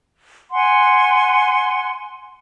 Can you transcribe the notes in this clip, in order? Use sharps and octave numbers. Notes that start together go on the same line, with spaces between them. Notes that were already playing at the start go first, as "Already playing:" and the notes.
F#5 G#5 C6